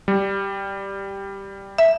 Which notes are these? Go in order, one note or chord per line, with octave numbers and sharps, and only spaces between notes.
G3
E5